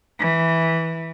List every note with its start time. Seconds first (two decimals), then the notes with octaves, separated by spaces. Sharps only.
0.19 E3